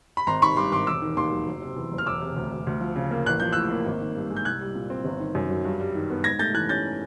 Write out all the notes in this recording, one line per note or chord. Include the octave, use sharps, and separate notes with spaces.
B5
G#1 A#5 C6
D#3 B5 C#6
G2 C6 D6
G#1 C6 D6
E1 D6 E6
D#3
D#2 C6 D6
F#3
F#1
C3
E2
F#1
F6
E1 D6 E6
C3
D2
E1
D2
F3
C#3
A#3
A1 F#6
F3 G6
A2 E6 F#6
A#3
G#1
D#3
G2
G#3
G6
C2 F#6 G#6
G3
A#2
C4
G1
D#3
F#2
F#3
G2
G3
D#3
B3
G#2 G#6 A#6
A3 G6 A6
E3 F#6 G#6
C#4 G6 A6